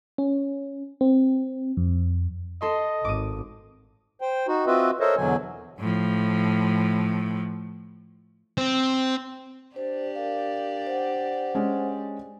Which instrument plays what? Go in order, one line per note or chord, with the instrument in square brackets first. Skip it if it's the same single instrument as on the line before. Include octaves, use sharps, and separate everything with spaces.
[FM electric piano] C#4
C4
F2
[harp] A4 C6 [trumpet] D#5
[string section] G#1 [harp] D6 D#6
[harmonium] C5 G5
D#4 F#4
C4 F4 F#4 B4 D#5 E5
A4 A#4 C5 C#5 D#5 E5
E2 B2 D3 F#3 G#5
[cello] A2 F3
[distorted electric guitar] C4
[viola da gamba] D4 G4 D5 [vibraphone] C5
[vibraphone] A#4 F5
C5 F#5
[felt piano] G#3 C#4